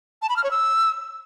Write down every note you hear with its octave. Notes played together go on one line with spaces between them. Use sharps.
A5
B5
F6
C#5
E6